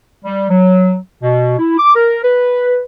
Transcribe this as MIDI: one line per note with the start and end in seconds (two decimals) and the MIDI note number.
0.23 0.46 55
0.49 0.96 54
1.22 1.54 47
1.58 1.74 64
1.77 1.92 86
1.94 2.20 70
2.23 2.80 71